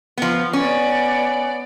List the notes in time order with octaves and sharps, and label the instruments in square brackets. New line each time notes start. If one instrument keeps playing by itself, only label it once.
[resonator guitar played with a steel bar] F3 B3
[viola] B3 D5 [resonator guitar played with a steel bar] C#4